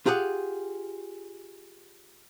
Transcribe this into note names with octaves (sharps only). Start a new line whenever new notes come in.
F4 G4 G#4 F#5